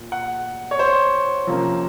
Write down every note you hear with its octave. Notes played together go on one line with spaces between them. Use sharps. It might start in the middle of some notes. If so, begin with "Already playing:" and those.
Already playing: A#2
F#5
C#5
C5
C3 F3 A#3 C#4